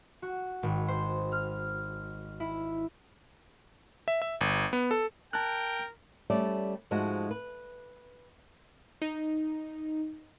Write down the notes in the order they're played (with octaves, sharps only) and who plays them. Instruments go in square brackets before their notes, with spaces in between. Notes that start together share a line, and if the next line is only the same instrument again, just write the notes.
[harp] F#4
G#1
C5
F6
E4
[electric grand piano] E5
E5
G1
B3
A4
[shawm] A#4 [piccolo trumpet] G5 [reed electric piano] A5 F#6
[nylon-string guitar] G3 A3 C#4 D5
G#2 F3 G#3 A3 F4 F#4
B4
[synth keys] D#4